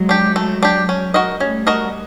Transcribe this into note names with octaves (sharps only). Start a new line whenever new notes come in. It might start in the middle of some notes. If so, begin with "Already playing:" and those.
Already playing: F#3 G#3
D4 G4
A3
D4 G4
C#4
F#4 A#4 D#5
G3 A3 C#4
F#4 A#4 D#5